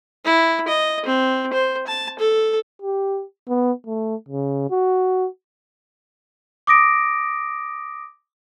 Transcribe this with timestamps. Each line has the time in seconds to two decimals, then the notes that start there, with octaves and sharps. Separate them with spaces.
0.25 E4
0.68 D#5
1.06 C4
1.53 C5
1.87 A5
2.19 A4
2.82 G4
3.49 B3
3.87 A3
4.29 C#3
4.71 F#4
6.67 D6 D#6 A#6 D7